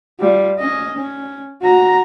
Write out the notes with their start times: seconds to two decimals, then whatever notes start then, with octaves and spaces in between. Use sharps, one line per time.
0.20 G3 F4
0.59 C#4 D#5
0.96 C#4
1.61 F#4 A#5